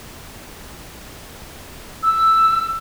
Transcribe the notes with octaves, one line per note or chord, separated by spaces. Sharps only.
E6